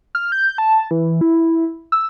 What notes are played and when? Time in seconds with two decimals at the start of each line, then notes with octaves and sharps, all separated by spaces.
0.15 F6
0.32 G6
0.58 A5
0.91 E3
1.21 E4
1.92 E6